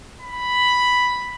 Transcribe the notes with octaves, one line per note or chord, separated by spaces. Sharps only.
B5